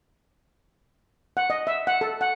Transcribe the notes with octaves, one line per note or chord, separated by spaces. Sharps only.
F#5
D#5
E5
F#5
A4
F#5